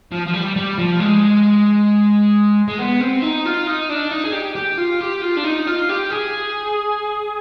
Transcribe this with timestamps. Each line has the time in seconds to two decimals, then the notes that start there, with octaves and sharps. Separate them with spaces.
0.12 F3
0.26 F3
0.33 G3
0.56 G3
0.78 F3
1.00 G#3
2.68 G#3
2.78 B3
3.00 C4
3.22 D#4
3.45 F4
3.67 D#4
3.89 D4
4.11 D#4
4.24 G#4
4.33 G4
4.55 G4
4.78 F4
5.01 G4
5.22 F4
5.37 D4
5.44 D#4
5.67 F4
5.89 G4
6.11 G#4